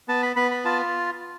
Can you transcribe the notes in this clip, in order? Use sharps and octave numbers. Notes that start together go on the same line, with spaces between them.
B3 A5
B5
B3 B5
B5
F4 A5